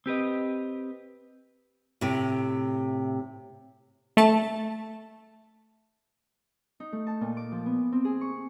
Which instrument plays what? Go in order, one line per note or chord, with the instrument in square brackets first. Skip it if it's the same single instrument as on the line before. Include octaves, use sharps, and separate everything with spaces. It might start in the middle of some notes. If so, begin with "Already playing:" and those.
[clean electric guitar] C4 G4 B4 D#5
[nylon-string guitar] A2 C3
[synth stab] A3 A5
[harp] D#4
A3
A5
A#2
D6
F3
B3
C4
G#4
C#6